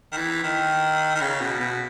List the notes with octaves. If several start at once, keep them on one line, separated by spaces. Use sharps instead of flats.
D#3
E3
D#3
D#3
C#3
B2
B2